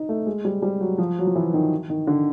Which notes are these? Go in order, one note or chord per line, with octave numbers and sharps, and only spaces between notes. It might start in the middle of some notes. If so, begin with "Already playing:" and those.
Already playing: D#4
A3
G#3
G3
G3
F#3
F3
F#3
F3
E3
D#3
D#3
D3